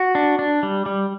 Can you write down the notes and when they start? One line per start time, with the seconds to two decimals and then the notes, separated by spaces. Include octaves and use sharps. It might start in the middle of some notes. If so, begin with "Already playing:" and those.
Already playing: F#4
0.15 D4
0.39 D4
0.63 G3
0.86 G3